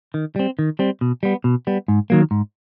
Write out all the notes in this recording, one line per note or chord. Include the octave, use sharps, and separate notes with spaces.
D#3
G3 C4
D#3
G3 C4
B2
G3 B3
B2
G3 B3
G#2
D#3 F#3 A#3
G#2